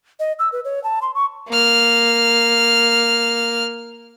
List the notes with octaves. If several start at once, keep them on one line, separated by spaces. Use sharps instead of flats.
D#5
E6
B4
C#5
A5
C6
C#6
A#3 F6